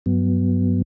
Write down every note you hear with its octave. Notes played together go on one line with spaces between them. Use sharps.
G2 F#3 B3